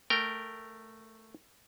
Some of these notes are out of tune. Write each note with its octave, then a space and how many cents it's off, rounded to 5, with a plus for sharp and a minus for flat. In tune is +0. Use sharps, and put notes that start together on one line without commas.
A3 +5 A#4 -10 G5 +0